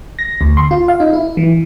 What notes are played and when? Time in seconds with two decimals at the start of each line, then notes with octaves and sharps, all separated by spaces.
0.19 A#6
0.41 D2
0.57 C6
0.71 F4
0.88 F5
1.00 D#4
1.13 E4
1.37 E3